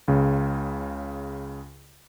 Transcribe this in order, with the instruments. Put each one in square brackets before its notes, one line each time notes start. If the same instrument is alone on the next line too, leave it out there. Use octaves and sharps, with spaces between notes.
[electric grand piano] C#2 C#3